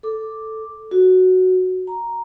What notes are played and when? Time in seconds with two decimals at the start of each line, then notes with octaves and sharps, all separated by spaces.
0.03 A4 D6
0.91 F#4
1.87 A#5